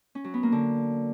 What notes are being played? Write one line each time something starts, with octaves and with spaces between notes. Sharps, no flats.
C#4
F#3
B3
A#3
D3